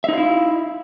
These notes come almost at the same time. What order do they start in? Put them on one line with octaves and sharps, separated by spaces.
E5 D#4 F5 E4